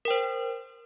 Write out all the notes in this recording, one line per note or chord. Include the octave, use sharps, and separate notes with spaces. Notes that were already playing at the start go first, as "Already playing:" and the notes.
A#4 C5 G5